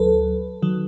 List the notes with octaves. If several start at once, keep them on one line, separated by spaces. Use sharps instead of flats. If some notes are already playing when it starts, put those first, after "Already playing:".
Already playing: D2 F#3 A4 B4
D#3 F#3